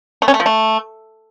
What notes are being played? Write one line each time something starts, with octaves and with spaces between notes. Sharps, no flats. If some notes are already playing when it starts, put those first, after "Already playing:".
A3
C#4
A3
F3
A3